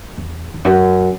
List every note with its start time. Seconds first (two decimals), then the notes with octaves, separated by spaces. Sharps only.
0.17 E2
0.54 E2
0.65 F#2